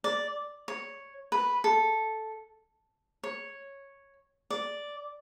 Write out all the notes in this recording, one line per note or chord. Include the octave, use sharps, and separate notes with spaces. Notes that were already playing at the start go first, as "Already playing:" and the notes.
D5
C#5
B4
A4
C#5
D5